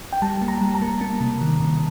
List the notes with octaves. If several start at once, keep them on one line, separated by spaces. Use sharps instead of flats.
G5
G3 A5
A#3
A#5
G3
A#5
A#3
A#3
C3
D#3
C3